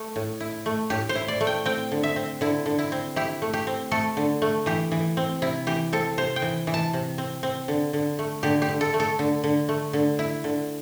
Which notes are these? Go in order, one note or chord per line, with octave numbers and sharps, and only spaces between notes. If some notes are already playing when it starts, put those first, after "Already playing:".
Already playing: A3
A2
E4
A3
A2 G4
C5
E4
D5
A3
G5
C4 G5
D3
E5
C4
D3 E4
D3
E4
C4
E4 G4
A3
G4
C4
A3 A4
D3
A3
E3 G4
E3
C4
C3 E4
E3 G4
C4 A4
C3 C5
G5
E3
E3
A5
C3
C4
C4
D3
D3
A3
D3 G4
G4
D3
A4
A3
A4
D3
D3
A3
D3
E4
D3